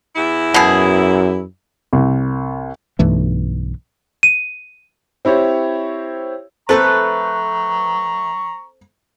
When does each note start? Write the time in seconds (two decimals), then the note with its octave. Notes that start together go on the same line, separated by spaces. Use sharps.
0.16 E2 E4
0.54 F#2 B2 G#4
1.93 C2
2.99 B1 G2 E3 A3
4.23 D#7
5.25 C4 E4 G4 C#5
6.69 A3 A#3 C4 A4 B4 A#5 C#6